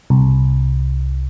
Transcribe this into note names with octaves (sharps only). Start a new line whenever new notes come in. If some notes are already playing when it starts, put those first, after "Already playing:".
C2